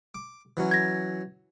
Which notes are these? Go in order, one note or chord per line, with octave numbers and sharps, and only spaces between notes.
D6
E3 F#3 C#4
G#6 A#6